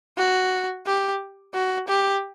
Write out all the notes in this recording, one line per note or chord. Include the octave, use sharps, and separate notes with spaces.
F#4
G4
F#4
G4